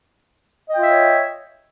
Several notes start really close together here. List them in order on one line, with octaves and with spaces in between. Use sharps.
D#5 G5 F4 E5 C#5